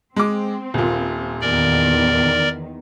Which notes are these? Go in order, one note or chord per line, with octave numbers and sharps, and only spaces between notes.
G#3 C4 D6
D#1 A#2
E2 D#3 A#4 D5